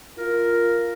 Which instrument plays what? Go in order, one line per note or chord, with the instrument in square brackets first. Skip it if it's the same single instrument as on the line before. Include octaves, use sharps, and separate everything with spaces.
[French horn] F4 [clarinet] A#4